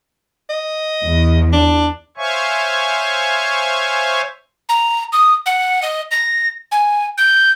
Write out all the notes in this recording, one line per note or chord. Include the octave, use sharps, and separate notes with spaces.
D#5
E2
D4
C5 C#5 E5 F5 G#5 C#6
A#5
D#6
F#5
D#5
A#6
G#5
G6